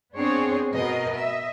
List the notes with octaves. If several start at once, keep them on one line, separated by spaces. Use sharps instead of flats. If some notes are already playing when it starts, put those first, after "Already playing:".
B3 C4 D4 G#4 C5 C#5
B2 A#4 B4 D#5
D#5 E5